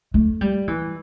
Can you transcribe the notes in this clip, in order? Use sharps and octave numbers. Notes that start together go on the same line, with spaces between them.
A3
G3
E3